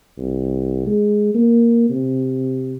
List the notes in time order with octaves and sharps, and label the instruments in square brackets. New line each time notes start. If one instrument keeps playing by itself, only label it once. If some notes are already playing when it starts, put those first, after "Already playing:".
[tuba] C2
G#3
A#3
C3